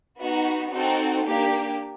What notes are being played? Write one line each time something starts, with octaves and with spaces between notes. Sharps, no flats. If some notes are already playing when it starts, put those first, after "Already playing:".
B3 D#4 F#4
C4 D#4 F#4 A4
A#3 D4 G4